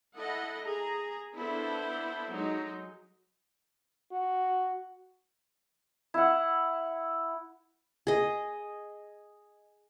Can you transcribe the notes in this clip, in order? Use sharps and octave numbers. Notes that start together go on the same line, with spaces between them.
E4 A4 D#5 F#5
G#4 A#5
B3 D4 E4 A4 C5
F#3 G#3 D#4
F#4
E4 F#5
G#4 D#5